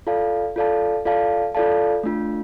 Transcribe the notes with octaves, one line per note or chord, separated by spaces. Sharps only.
F4 A4 D5 F5 A5
F4 A4 D5 F5 A5
F4 A4 D5 F5 A5
F4 A4 D5 F5 A5
A3 D4 F4